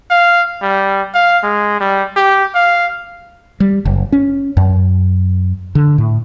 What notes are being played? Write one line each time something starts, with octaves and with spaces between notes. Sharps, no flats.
F5
G3
F5
G#3
G3
G4
F5
G3
F#1
C#4
F#2
D3
A2